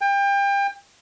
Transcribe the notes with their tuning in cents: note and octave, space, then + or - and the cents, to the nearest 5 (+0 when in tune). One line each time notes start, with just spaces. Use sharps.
G5 +30